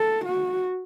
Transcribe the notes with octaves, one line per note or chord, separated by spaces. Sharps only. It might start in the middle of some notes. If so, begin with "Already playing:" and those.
Already playing: A4
F#4